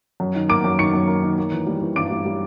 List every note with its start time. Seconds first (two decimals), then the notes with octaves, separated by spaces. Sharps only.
0.20 F#2
0.35 D#3
0.49 A#3 D6 D7
0.64 F#2
0.79 D#3 C#6 C#7
0.94 F#2
1.08 A#3
1.23 D#3
1.37 A#3
1.52 E3
1.67 G3
1.81 E3
1.96 G2 D6 D7
2.11 G3
2.25 G3